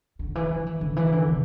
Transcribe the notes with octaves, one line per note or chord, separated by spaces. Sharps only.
D3
E3
F3
E3
D3
E3
D3
C3